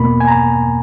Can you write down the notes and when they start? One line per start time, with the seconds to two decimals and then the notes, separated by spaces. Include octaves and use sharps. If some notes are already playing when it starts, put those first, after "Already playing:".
Already playing: E2 B2 A#3 B5
0.20 G#5
0.28 A#5